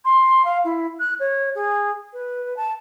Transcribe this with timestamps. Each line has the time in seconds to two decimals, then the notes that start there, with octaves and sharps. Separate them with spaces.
0.05 C6
0.45 F5
0.64 E4
0.99 F#6
1.19 C#5
1.55 G#4
2.13 B4
2.56 A5